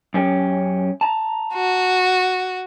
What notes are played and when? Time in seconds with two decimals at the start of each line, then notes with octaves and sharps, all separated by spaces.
0.14 F#2 C#4 G4
1.01 A5 A#5
1.54 F#4